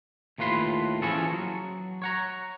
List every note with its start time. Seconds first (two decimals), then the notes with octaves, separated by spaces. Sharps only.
0.38 D#2 A2 F4 B4 C6
1.02 E3 F3 C#4 F#4 G#4 A4
1.32 F#3
2.02 C#5 F#5 A#5